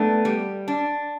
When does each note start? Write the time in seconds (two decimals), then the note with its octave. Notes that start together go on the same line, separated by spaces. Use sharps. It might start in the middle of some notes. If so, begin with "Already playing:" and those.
Already playing: A3 B3 D4
0.25 G3
0.68 D4